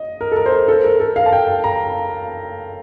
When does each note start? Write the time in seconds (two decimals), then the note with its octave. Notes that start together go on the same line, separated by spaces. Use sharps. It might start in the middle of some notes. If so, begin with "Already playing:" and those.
Already playing: D#5
0.21 A#4
0.32 A4
0.36 A#4
0.46 C5
0.52 A#4
0.68 A4
0.84 A#4
1.00 A4
1.16 F5
1.26 A5
1.32 G5
1.64 A#5